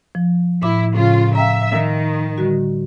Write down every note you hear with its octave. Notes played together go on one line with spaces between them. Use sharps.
F3
A2 E4 D6
A2 C#3 F4
E5 F5 G5 A#5
D#3
D3 G3 F#4